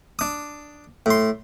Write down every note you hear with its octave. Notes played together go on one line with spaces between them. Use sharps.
D4 D#6
A2 C6